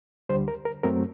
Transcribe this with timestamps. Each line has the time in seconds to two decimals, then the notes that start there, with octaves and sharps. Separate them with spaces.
0.29 D2 D3 G3 C5
0.48 A#4
0.65 A#4
0.83 F#2 F#3 A3 C4 A#4